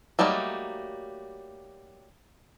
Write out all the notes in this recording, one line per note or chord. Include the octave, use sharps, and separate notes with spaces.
F#3 G3 A3 A#3 D#4